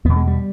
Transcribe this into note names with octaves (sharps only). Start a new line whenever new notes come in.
E2 B2 B3
G#3
G3